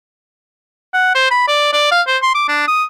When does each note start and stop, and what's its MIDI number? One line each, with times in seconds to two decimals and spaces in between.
0.94 1.13 78
1.15 1.30 72
1.31 1.46 83
1.48 1.69 74
1.73 1.88 74
1.92 2.02 77
2.07 2.18 72
2.23 2.32 84
2.35 2.46 86
2.49 2.65 62
2.68 2.84 87